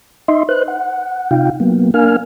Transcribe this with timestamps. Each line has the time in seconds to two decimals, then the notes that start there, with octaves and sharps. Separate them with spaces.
0.28 D#4 D#5 E5 C6
0.49 B4 C5 F#6
0.68 F#5
1.31 C3 D#4 F4 F5 G5
1.60 F#3 A#3 B3
1.94 A#3 D4 A#4 F5 G#5 F6